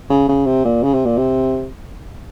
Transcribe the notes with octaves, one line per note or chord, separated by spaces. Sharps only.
C#3
C#3
C3
A#2
C#3
C3
A#2
C3